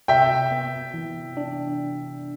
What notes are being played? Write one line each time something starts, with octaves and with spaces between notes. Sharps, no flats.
C3 E5 G5
B3
E3
D4